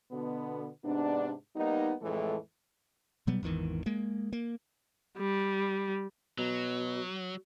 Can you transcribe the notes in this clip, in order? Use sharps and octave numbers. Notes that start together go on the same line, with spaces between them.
B2 D3 B3
G#2 C3 B3 D4
G3 A#3 B3 D#4
F2 A2 E3 G#3 A3 A4
B2 F#3 G3 B3
G#1 E2 D#3 E3
G#3 A#3
A#3
G3
B2 F#3